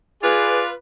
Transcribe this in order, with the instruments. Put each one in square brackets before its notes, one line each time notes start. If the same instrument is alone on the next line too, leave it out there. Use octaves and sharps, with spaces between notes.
[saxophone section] F4 B4 [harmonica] G#4 [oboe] D5